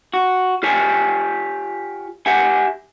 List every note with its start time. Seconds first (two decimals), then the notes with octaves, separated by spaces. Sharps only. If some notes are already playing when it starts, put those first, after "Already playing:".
0.14 F#4
0.63 F4 G4 C#5 G#5
2.26 G4 E5 F#5 G#5